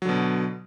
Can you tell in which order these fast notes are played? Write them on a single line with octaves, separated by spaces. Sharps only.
F#3 D3 B2